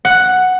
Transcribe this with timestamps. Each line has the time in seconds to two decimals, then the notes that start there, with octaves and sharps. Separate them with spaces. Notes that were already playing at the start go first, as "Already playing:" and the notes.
0.05 F#5